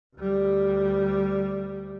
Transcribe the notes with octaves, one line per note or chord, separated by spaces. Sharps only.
D2 G3